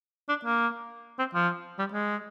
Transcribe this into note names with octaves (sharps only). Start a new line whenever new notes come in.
D4
A#3
C4
F3
G3
G#3